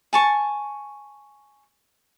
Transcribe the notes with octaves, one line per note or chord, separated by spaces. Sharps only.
G#5 A5 C#6